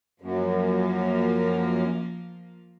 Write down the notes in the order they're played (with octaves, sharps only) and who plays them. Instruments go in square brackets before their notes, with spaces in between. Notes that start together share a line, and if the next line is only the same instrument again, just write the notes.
[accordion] F#2 [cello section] F3 A#3 F4